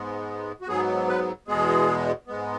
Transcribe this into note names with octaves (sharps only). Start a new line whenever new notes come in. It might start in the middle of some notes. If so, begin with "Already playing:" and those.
Already playing: G#2 G#3 B3
F#4
G#2 F#3 B3 G#4
B4
E2 B2 G#3 B3 G#4
G#2 G#3 B3